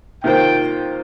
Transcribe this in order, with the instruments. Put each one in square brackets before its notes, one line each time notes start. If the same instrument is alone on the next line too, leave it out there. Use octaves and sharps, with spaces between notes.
[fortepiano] C3 D#3 A#3 F4 C5 [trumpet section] G5